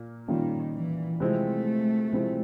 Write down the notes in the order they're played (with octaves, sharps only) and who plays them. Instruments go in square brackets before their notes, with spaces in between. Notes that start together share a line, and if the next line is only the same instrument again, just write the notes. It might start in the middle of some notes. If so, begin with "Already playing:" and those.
Already playing: [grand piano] A#2 A#3
[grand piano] A#2 G3 A#3 C#4 F4 [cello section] D#3
[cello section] E3
[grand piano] C3 F3 G#3 C4 E4 [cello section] A3
[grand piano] C3 F3 G#3 C4 E4